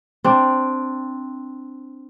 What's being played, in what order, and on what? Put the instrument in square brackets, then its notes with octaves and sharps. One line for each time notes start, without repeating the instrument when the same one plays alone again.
[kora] C4 D4